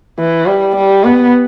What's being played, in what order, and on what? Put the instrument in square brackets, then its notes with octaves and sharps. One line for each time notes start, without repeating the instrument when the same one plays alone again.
[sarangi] E3
G3
G3
B3